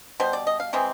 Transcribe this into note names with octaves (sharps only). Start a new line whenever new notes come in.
B2 G3 C5
D5
D#5
F5
C3 E3 G#3 C4